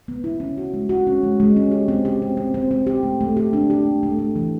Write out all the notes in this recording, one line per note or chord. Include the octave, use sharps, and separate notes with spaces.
B3
E4
C#4
F#4
G#3
F#4
C#4
G#3
G#3
C#4
G4
C4
G4
C4
C4
C4
C4
G4
A3
A3
G4
D4
G4
A3
A3
A3
E3